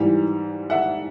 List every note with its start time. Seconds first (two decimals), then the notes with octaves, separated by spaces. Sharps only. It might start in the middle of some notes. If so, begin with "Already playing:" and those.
Already playing: G#2 E3 G3
0.70 E5 F#5